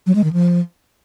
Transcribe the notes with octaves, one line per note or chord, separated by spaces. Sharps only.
F#3
G#3
D#3
F3